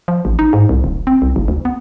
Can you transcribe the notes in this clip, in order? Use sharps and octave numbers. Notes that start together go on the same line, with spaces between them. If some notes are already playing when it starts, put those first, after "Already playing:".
F3
A1
D#4
G#2
C2
D#1
C4
C2
F#1
D2
B3